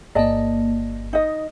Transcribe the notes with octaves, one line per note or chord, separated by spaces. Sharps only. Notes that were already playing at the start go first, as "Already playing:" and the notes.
G1 A#3 D5 D#5 A5
D#4 D#5